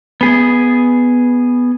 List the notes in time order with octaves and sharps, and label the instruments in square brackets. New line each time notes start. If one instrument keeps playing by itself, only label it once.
[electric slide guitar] B3 G#4